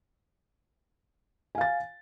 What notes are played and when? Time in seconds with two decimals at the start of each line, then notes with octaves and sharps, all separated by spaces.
1.55 G#5
1.58 F5
1.61 A6